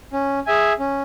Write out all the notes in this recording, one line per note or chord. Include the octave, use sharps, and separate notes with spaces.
C#4
G#4 E5 G#5
C#4